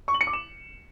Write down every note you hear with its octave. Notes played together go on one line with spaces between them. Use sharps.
C#6
F#7
C#7
D6
E7